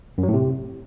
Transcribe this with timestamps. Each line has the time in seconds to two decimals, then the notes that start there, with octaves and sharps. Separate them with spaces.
0.18 F#2
0.23 F#3
0.28 A2
0.34 C3